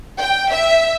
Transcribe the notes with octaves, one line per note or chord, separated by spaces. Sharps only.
G5
E5